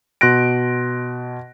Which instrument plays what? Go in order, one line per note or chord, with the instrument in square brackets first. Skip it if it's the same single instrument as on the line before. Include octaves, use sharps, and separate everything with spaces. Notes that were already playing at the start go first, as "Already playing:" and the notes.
[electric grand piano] B2 C6 F#6 A#6 D7